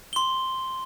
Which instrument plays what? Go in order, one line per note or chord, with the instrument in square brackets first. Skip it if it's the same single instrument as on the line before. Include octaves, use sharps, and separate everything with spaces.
[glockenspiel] C6 G7